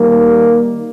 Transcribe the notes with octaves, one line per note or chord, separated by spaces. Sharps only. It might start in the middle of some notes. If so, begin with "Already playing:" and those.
Already playing: D#3 G3 A#3